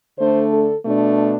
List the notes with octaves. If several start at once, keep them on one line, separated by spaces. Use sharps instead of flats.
D3 A3 D4 C5
A4
B2 A3 D4